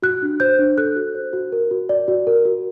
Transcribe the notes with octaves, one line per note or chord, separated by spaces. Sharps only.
F#4 F#6
D4
C5 G6
D4
A4 F#6
F#4
C5
F#4
A#4
F#4
D5
F#4
A#4
F#4